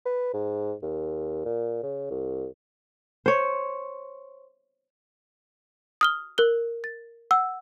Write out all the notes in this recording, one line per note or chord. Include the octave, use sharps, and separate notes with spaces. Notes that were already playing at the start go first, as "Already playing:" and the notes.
B4
G#2
D#2
A#2
C#3
C2
C5 C#5
D#6 F6 G7
A#4 F#6 G7
A6
F#5 E6